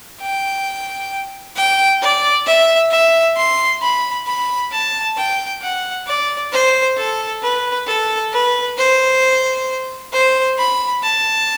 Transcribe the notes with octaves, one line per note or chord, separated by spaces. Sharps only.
G5
G5
D5
E5
E5
C6
B5
B5
A5
G5
F#5
D5
C5
A4
B4
A4
B4
C5
C5
B5
A5